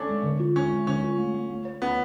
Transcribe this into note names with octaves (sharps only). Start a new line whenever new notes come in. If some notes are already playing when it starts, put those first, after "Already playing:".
Already playing: A3 C#4 D4
G#3
D3
F4
G#3 C#4
G#3
D3 C#4
F4
A3
A3
A3
C#5
B3 C#4